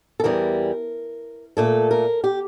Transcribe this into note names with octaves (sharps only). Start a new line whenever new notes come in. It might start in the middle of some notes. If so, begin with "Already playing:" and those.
A4
E2 E3 G3 A#4
A#2 A3 A4
A#4
G4